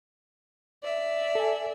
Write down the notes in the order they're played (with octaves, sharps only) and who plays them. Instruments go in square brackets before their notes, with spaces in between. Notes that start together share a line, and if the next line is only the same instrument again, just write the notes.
[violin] D5 E5
[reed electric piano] A4 G#5